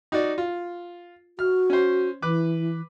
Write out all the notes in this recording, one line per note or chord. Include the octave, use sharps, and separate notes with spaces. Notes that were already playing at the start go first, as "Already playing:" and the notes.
D#4 F#4 D5
F4
F#4 F6
C#4 C5
E3 B4 D6